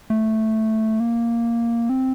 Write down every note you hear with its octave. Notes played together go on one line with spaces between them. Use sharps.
A3
A#3
C4